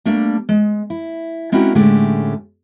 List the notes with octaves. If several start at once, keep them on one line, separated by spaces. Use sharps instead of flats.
G3 A3 A#3 D4
G#3
E4
G#3 C4 C#4 E4 F#4 A#4
A2 D3 G#3 A3 C#4 G4